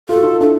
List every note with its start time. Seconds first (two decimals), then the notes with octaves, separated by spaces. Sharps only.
0.09 F4 A4
0.16 F#4
0.23 D#4 F4
0.41 D4 E4 A4